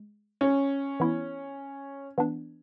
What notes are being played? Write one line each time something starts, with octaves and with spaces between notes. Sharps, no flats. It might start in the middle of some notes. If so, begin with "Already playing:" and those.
Already playing: G#3
C#4
E3 B3 E4
E3 B3 D4